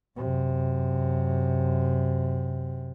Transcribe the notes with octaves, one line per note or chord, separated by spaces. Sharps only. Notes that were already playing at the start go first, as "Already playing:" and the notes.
F#2 C3